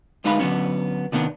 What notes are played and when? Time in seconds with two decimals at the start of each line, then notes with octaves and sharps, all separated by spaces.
0.24 D2 G#3 D#4 B4 F5 B5
0.39 D3 D#3 F#3 B3 C#4
1.12 C3 D#3 B3 C#4 D4